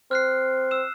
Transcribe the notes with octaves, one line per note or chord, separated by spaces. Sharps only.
C4 F6 F#6 C7
E6 E7